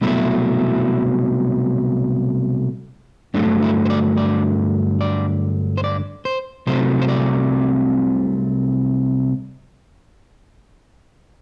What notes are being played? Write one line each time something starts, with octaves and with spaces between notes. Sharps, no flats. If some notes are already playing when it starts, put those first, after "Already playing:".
C2 B2 F#3 A3 E4
G2 D3 F#3 A3 D4
E4
C5
D5
D5
D5
C5
D5
C5
C2 C3 F#3 A3 C5
C5
D5